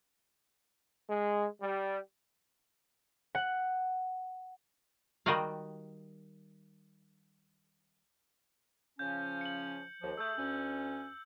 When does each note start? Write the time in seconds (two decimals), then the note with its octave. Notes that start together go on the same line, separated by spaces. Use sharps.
1.09 G#3
1.62 G3
3.35 F#5
5.26 D#3 G3 F#4 D#5 F5
8.99 C#3 F3 C#4 G6
9.41 C#7 F#7
10.02 D#2 F3
10.18 A3 G#4 E6 G6
10.38 D2 C#4